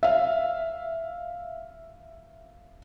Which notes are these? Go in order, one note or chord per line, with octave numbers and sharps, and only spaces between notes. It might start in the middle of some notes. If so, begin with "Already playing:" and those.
E5 F5